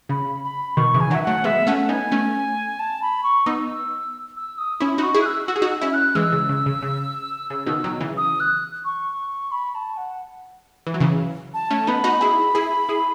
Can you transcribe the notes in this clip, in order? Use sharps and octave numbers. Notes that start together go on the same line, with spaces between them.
C#3 B5
B5
B2 D#3 C#6
C#3 E3
G#5
D#3 F#3
E5
F#3 A3 F#5
G#3 B3 E5
A3 C#4 F#5
B3 D#4 G#5
A3 C#4
A5
B5
C#6
B3 D#4 E6
E6
D#6
C#4 E4 B5
D#4 F#4
C#6
E4 G#4
F#6
E6
F#4 E6
G#4
D#4 F#4
E6
C#4 E4
F#6
E3 G#3 E6
C#3
C#3
C#3
C#3
C#3
B2 D#3
D#3 F#3
C#3 E3
D#6
F#6
C#6
B5
A5
F#5
E3
F#3
C#3 E3
A5
A3 C#4
B3 D#4 B5
D#4 F#4
E4 G#4
E4 G#4
E4 G#4